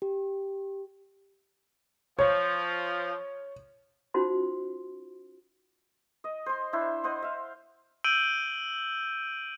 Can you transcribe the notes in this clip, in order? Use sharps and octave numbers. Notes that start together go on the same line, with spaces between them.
G4
F3 C#5
C#4 D#4 F4 F#4 C5 C6
D#5
C5 C6
D4 E4 C5 E5
C5 D#5 F#5 C6
E5 F5
E6 G6 D7 D#7 F#7 G7